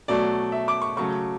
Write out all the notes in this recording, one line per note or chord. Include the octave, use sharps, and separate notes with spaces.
B2 F#3 A3 D5
E5
D6
C#6
C#3 F#3 A3 C#6